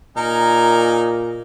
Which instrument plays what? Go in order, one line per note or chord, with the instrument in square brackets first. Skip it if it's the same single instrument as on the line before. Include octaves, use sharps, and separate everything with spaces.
[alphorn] A#2 [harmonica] D#4 A#4 G#5